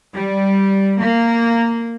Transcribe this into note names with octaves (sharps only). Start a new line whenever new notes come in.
G3
A#3